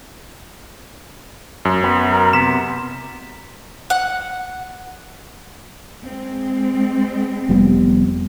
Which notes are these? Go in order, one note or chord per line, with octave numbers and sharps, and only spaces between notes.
F#2
B3
A#4
C3 B3 E7
F#5
G#3 C4
F1 G3 B3